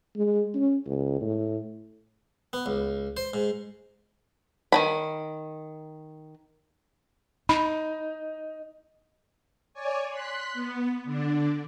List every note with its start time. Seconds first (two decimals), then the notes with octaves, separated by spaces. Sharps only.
0.16 G#3
0.55 C#4
0.86 C#2
1.21 A2
2.53 B3
2.66 C#2
3.17 C5
3.34 G#2
4.72 D#3 F#3 B5
7.49 D#4 B5
9.74 C#5 D5 G#5
10.09 C6 F#6 B6
10.53 B3
11.04 D3 D4